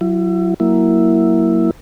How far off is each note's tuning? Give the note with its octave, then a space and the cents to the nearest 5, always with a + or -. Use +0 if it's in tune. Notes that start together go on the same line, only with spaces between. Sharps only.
F#3 +0 E4 +30
F#3 +0 A#3 +0 E4 +0